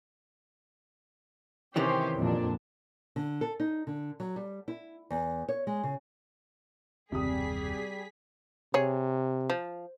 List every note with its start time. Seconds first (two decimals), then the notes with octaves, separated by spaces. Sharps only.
1.76 C3 D#3 E3 C#4 G4 C5
2.17 F2 A#2 D4
3.16 D3
3.41 A4
3.60 D#4
3.87 D3
4.20 F#3
4.36 G3
4.68 E4
5.10 E2
5.48 C#5
5.67 G#3
5.83 C#3
7.12 F#1 D#2 C3 G3 G#4 D#6 B6
8.74 C3 G#4 C#5
9.50 F3